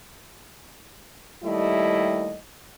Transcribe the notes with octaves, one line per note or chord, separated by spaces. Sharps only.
D#2 G3 A3 E4 D#5